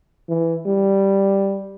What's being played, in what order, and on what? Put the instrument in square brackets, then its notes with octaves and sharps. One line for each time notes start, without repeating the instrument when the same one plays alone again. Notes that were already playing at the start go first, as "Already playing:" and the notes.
[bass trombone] E3
G3